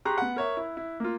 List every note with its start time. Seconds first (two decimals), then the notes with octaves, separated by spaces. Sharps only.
0.05 G4 G#4 A#5 C6 C#6 F#6
0.18 B3 F#5
0.36 A#4 C#5 E5
0.57 E4
0.77 E4
1.00 A#3 F4